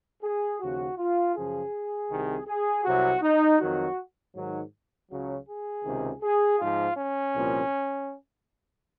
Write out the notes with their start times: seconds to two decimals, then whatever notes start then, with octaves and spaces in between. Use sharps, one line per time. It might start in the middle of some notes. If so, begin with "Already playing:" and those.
0.23 G#4
0.60 D#2 C#3 F3 F#4
0.98 F4
1.35 F#2 C#3 F3 G#4
2.10 C2 C3 D#3
2.47 G#4
2.85 C2 C3 F#3 F#4
3.22 D#4
3.60 F2 D#3 F#3 F#4
4.34 G#2 D#3 F#3
5.09 C#2 C#3 F#3
5.48 G#4
5.84 C#2 C3 D#3
6.22 G#4
6.59 G#2 F3 F4
6.97 C#4
7.33 C2 A#2 F3